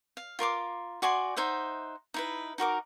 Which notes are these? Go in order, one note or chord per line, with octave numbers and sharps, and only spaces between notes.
F5
F4 A#4 C6 D6
F#4 D5 G#5 C6
D#4 C5 E5 F#5
D#4 E4 B4
D#4 F#4 A#4 D6